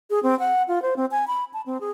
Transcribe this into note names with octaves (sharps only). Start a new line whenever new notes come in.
G#4
C4
F#5
F4
C5
C4
G#5
B5
A5
C4
G#4